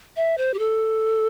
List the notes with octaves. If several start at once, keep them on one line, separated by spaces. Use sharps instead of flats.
E5
C5
G4
A4